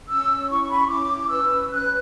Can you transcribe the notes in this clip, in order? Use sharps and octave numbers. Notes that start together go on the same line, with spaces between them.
C#4 E6
E4 C#6
B5
C#6
C#4 D6
B4 E6
C#4 F#6